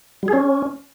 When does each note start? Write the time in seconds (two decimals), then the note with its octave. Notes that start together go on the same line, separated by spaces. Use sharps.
0.23 G3
0.28 G#4
0.33 C#4